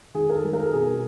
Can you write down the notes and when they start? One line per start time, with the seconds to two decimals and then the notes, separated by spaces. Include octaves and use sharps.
0.14 D#3 G#4
0.30 A#4
0.34 A4
0.43 G3
0.53 A#4
0.73 B2 G#4